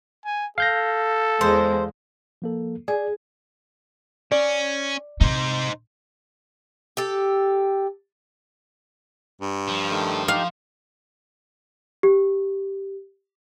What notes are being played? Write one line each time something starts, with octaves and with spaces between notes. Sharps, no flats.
G#5
A4 F5 G6 A#6
E2 G#3 C5
F3 A#3 A4
G#4 D5
C#4 D5
C3 D#4 C5
G4 A4
G2
F3
D#3 A3
D#4 G4 F5
G4